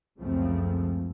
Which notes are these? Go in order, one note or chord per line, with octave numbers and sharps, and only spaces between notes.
C#2 F#2 C#3 F3 A3 C4